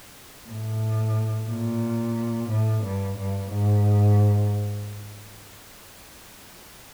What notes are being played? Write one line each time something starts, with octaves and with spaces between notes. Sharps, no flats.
A2
A#2
A2
G2
G2
G#2